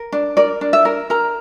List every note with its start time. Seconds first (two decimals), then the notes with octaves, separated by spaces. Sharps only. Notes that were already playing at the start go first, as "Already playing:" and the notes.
Already playing: A#4
0.12 D4
0.37 A#4 D5
0.61 D4
0.73 E5
0.85 A#4
1.10 A#4 A#5